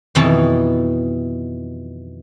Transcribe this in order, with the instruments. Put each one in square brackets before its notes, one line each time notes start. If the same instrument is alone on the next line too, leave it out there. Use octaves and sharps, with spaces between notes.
[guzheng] F2 B2 D#3 E3 D#4 A4